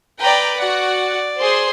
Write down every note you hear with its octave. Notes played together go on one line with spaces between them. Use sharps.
B4 D5 G5 A#5
F#4 D5 F#5
G#4 C5 C6